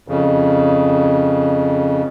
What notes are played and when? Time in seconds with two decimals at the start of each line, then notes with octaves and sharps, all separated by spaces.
0.08 F2 C#3